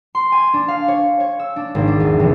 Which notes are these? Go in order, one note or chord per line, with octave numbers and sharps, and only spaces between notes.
C6
G#5
D4
F5
C#5
C#5
E6
D4
G#1
D4
E2
F1